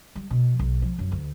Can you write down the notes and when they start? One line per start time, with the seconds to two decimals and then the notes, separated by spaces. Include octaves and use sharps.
0.15 G3
0.31 B2
0.59 B1
0.82 F3
0.98 F#2
1.12 D2